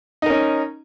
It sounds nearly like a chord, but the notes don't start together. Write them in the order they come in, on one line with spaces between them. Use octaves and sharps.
D#4 A#4 C#4